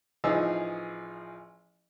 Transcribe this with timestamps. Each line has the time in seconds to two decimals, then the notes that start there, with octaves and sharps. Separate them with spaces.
0.24 A1 E3 F3 D#4 G#4 E6